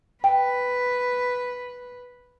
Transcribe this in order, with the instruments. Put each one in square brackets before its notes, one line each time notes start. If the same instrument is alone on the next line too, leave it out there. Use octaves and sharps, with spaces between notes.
[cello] B4 [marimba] G5